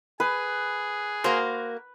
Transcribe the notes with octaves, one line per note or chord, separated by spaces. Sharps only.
G#4 B4
A#3 F#4 A#4 C5